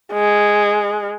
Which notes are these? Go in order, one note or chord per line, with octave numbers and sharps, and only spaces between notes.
G#3